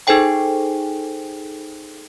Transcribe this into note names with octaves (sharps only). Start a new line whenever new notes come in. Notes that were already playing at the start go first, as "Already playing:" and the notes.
D#4 G#4 A4 C5 G5 G#5